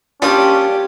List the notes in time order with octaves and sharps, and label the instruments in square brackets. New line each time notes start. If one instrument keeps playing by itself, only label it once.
[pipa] G3 A#3 D4 [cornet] C#4 [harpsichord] F4 D#6 [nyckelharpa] G4